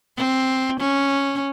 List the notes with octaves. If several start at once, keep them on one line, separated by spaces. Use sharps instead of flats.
C4
C#4